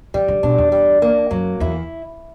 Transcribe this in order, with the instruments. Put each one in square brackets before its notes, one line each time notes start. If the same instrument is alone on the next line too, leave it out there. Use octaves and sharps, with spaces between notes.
[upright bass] E3 [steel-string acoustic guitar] G3
[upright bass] D3
[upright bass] B2 [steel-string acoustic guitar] D4
[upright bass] E2
[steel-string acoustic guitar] G3
A#3
[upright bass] F#2 [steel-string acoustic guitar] F#3
[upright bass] E2 [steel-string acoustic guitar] E4